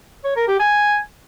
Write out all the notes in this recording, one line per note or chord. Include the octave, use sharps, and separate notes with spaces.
C#5
A#4
G4
G#5